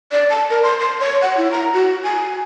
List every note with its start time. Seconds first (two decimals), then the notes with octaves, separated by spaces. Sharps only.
0.12 D5
0.30 A5
0.50 A#4
0.63 C6
0.80 C6
1.00 C#5
1.22 F#5
1.37 E4
1.51 A#5
1.74 F#4
2.04 G#5